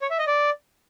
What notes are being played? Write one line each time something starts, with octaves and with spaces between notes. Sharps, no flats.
C#5
E5
D#5
D5